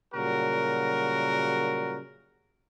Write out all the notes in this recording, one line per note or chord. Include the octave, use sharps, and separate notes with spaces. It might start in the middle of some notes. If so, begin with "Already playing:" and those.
A#2 C#3 F#3 G3 F#4 A#4